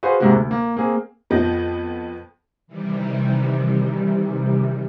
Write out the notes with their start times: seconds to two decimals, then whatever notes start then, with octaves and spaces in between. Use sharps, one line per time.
0.03 F#4 G#4 B4 C5 F5
0.20 G#2 C3 G#3 A#3 F#4
0.34 D2
0.51 A#3
0.77 A#3 C4 G#4
1.30 F2 F3 B3 D#5 G6 A#6
2.67 C3 D#3 E3 G3